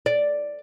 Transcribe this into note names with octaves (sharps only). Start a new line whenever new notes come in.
D5